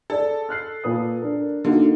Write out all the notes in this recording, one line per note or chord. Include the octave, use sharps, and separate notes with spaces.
G#4 A4 D5
F6 F#6 C7
A#2 B4 D#6
D4 A#4
D3 A#3 D#4 F#4